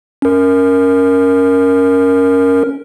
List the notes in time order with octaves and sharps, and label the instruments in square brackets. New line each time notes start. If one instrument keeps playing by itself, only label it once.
[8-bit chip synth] C#4 A#4